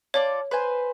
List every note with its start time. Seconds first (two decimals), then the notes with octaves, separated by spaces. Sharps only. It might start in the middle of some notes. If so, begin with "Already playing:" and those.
0.14 F4 A4 C#5 D5
0.51 B4 C5 G#5